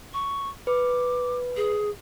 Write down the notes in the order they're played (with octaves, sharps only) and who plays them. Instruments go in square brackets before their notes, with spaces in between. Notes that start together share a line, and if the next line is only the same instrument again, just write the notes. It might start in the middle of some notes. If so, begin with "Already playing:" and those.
[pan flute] C#6
[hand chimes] B4 [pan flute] D6
[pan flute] G#4